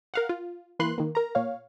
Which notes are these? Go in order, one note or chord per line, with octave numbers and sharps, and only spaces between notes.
A#4 F5 F#5
F4
E3 A#3 B4 C6 F#6
D#3 A#3
A#4 A#5
A#2 C#5 F5